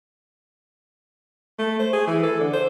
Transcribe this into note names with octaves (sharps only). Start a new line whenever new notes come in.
A3
C5
G#4
E3
A4
D3
C5